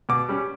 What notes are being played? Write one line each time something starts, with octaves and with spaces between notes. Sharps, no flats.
B2 D6
G3 C#4